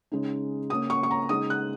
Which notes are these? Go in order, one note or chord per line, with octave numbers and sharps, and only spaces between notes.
C#3 G#3 D#4
C#3 A#3 C#4 D#6
C#6
C#6
A#5
C#3 G#3 D#4 D#6
F#6